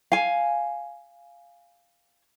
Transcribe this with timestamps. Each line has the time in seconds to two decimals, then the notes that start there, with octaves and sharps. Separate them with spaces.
0.12 F5 G#5